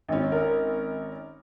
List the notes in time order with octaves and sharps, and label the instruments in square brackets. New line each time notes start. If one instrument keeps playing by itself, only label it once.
[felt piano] G#1 C#4
[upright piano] A#4